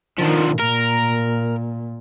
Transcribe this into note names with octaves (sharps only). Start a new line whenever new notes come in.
D3 D#3 F3
A#2 A#4